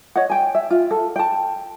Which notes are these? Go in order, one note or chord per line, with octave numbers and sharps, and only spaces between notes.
C#5 D#5 F#5
G5 G#5
E5
F4
A4
G5 A5